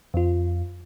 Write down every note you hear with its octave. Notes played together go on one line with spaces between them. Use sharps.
F2 F4